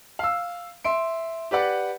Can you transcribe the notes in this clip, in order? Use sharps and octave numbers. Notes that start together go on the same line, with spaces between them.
F5 E6
E5 C6 D7
G4 B4 D5 F#5